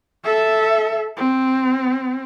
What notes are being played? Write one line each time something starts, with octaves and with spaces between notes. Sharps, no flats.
A4 E5
C4